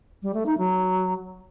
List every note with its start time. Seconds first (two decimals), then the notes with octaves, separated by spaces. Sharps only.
0.22 G3
0.34 A3
0.46 D#4
0.58 F#3